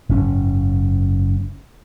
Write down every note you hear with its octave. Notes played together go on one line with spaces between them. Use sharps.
F#1 G#2 C#4